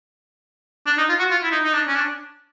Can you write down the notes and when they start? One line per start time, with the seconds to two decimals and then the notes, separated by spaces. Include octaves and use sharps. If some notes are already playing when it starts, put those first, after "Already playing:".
0.87 D4
0.98 D#4
1.09 F4
1.19 F#4
1.31 F4
1.43 E4
1.52 D#4
1.64 D#4
1.74 D4
1.88 C#4
1.96 D4